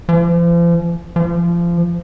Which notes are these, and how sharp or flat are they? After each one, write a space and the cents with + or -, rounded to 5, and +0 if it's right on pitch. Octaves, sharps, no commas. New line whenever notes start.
F3 -40
F3 -25